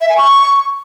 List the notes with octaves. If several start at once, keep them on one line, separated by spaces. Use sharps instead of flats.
E5
G#5
C#6